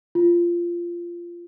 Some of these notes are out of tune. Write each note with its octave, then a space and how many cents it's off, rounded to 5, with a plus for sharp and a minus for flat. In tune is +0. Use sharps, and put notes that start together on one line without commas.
F4 -15